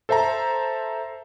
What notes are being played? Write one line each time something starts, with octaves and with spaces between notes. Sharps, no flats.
A4 C5 E5 A5 A#5